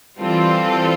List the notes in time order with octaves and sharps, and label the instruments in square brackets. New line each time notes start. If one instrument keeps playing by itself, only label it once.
[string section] E3 G3 C4 F4 A4